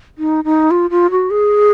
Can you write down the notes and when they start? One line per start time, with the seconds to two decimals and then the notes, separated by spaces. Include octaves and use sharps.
0.18 D#4
0.45 D#4
0.71 F4
0.90 F4
1.11 F#4
1.30 G#4